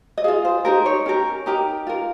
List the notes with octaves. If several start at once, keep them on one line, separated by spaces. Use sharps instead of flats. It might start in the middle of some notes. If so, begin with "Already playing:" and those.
D#5
F4 G#4 F5
C5
D#4 G4 A#4 C5
C#5
C#4 G4 A#4
D#4 G4 A#4 A#5
F4 A#4